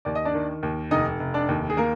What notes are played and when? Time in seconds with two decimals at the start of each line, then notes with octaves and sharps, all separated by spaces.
0.05 D#2 D5
0.15 D#5
0.25 D4 D5
0.34 D#3
0.63 D#2
0.91 F1 D#4 D#5
1.20 F1
1.34 D4 D5
1.49 D#2
1.70 G#4
1.77 A#3 A#4